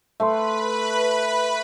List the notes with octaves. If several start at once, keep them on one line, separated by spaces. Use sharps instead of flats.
A3 B4 B5 C6